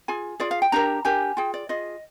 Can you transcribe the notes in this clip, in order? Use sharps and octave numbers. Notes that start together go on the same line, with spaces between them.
F4 G#4 G#5
F4 G#4 D5
F5
G5
D4 G4 A#4 A#5
D4 G4 A#4 G#5
F4 G#4 G5
D5
F4 G#4 D#5